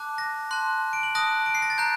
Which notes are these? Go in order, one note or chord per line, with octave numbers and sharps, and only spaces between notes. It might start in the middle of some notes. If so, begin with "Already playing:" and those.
Already playing: A5 D6 F#6
A#6
A5 C6 F#6
D7
F#7
A5 D#6 F#6 A#6
D7
C7
A#6
A6
A#5 F#6 G6